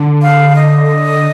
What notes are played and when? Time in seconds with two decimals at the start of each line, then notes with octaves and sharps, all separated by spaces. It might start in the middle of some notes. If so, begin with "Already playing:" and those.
Already playing: D3
0.22 F5
0.55 D#5